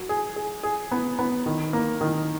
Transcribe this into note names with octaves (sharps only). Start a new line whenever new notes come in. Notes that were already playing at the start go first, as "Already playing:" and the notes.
Already playing: F#3
G#4
G#4
G#4
B3
B3
D#3
A#3
D#3